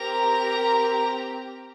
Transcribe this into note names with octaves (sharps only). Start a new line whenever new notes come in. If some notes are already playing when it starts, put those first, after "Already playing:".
Already playing: C4 G4 A#4 A#5